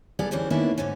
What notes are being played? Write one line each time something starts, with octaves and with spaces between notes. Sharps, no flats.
G3 B3 G#4 A4 D5 F5
D2 E3 C#4 G4 G#4 C5
D#3 A#3 B3 C#4 D4 E4
G#2 D3 A3 C#4